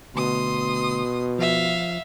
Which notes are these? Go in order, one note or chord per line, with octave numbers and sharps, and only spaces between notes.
D2 B2 C6 D#6
F3 E5 F5